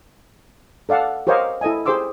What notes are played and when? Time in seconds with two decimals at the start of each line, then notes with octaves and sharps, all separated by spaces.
0.89 A4 D5 F5 F#5 A5
1.27 G4 A#4 C5 C#5 D#5 F5
1.61 E4 A4 D#5 G#5
1.86 G4 G#4 C5 C6 D6 E6